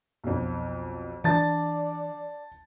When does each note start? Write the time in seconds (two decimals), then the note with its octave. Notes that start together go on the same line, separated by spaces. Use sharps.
0.24 B1 F2
1.24 E3 D4 D5 A5 A6